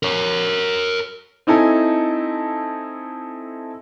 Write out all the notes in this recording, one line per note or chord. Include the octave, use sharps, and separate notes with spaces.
A#4 C#5
C4 D#4 E4 A4 G#5